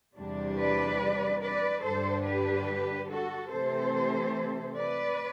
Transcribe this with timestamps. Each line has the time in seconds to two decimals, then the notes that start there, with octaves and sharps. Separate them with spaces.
0.17 E2 C3 G3 D4
0.59 B4 D5
1.42 B4 D5
1.83 G2 D3 G3 D4 A4 C5
2.25 G4 B4
3.09 F#4 A4
3.50 C3 E3 A3 A4 C5
4.75 B4 D5